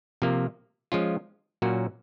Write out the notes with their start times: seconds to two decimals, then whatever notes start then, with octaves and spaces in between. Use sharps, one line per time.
0.22 C3 F3 A#3
0.92 F3 G#3 C#4 F4
1.62 A#2 F#3 A#3 C#4 F#4